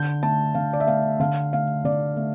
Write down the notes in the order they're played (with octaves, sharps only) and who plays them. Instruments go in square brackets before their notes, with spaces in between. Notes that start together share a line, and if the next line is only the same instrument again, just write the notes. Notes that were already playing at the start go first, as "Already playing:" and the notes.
Already playing: [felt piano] D3 G6
A3 A5
D3 F5
D5
E5
A3 F5
D3 F5
A3 F5
D3 D5
A3